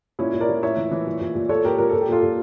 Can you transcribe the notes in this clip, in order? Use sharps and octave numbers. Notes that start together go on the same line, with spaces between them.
A#2 C#4 E4
A#2
A#4 D5
A#2
A2 C#5 E5
E3
E3
A#2
A#2
A#2
A#2 A4 C#5
A#2 G4 A#4
A#2 A#4
A#2 A4
G4
A#2 F4 A4
A#2